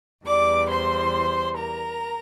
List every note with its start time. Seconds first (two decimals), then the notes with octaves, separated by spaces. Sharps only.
0.25 E2 E3 G3 D5 D6
0.69 C5 C6
1.57 A#4 A#5